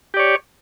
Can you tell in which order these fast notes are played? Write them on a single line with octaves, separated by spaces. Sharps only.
G4 D5 C#5